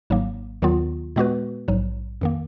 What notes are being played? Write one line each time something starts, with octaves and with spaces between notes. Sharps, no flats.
G#1 G#2 F#3 A#3
D#2 D#3 F#3 B3 F4
A#2 G#3 B3 F#4 B4
A#1 G#2 F#3
F2 D#3 A#3